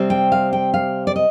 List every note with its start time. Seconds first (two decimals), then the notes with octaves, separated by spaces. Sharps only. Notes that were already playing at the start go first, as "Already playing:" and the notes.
Already playing: C3 G3 C4
0.10 G5
0.32 F5
0.53 G5
0.74 F5
1.07 D5
1.16 D#5